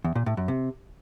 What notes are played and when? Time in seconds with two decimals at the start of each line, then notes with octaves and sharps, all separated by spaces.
0.04 E2
0.15 A#2
0.26 A2
0.37 F#2
0.48 C3